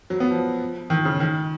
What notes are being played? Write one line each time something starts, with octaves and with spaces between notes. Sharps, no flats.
F#3
B3
F3
D#3
C#3
D#3